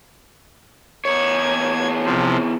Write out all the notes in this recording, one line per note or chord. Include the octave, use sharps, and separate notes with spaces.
E2 C#5 G#6
C3 F3